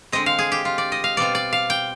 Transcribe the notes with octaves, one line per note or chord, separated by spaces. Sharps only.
D3 G#3 C4 D#5
F5
G#4
G4
F4
D5
D#5
F5
B2 G3 C4 F4 D5
D5
F5
G5